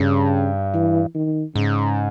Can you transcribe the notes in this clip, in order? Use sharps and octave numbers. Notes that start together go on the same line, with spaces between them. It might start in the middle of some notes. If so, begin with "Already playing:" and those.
Already playing: G2 C#3
E3
D#3
G#2 C#3